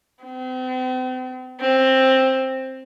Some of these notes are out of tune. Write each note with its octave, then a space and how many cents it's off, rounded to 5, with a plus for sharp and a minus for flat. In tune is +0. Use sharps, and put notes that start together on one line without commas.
C4 -40
C4 +10